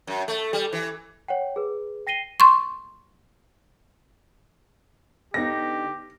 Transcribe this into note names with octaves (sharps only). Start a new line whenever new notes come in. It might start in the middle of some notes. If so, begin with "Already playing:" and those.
F#2
A3
G3
E3
C#5 F#5 G5
G#4 B4
G5 A#6 C7 D#7 G7
C6 C#6
D3 B3 D#4 G4 A#6